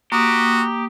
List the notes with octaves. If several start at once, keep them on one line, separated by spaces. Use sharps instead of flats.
A#3 F#4 G4 D#6